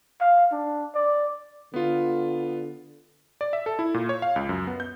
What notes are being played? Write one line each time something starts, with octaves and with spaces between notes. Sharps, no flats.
F5
D4
D5
D3 B3 F4
D5
E5
A4
E4
A#2
C#5
F5
C#2
F#2
B3
G6